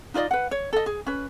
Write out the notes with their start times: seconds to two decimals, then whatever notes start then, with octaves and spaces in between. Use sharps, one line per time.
0.14 D#4 F4 D5 D#5
0.31 B4 F#5
0.51 C#5
0.73 A4 D#5
0.86 G#4
1.06 C#4 B4